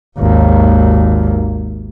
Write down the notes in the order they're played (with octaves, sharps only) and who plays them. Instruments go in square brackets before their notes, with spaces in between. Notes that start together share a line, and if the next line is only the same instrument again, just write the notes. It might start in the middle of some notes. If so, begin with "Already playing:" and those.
[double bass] G#1 D#2